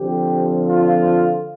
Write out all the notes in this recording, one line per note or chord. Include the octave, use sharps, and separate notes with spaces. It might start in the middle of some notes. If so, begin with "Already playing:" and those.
Already playing: D3 F3 C4 G4
F4